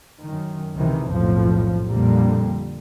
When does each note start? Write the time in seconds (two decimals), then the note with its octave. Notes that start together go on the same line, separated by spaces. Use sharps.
0.23 F#2 D#3
0.74 C#2 C3 D#3 E3
1.09 B1 F2 A2 F3
1.88 A#1 F2 A#2 D3 G3 A#3